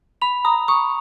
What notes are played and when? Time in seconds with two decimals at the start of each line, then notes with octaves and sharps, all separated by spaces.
0.22 B5 F7
0.45 A#5 D#6
0.68 C#6 D#6